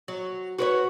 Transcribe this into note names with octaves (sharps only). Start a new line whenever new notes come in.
F#3
F#4 B4 C#5